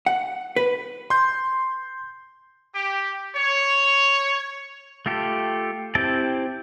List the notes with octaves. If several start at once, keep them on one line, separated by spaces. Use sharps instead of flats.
F#5
B4
C6 G6
G4
C#5
A3 F4 G4 A4
C4 E4 G4 G5 A5